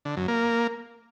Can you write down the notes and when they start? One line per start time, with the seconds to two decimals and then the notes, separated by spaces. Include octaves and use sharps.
0.05 D3
0.17 F#2
0.28 A#3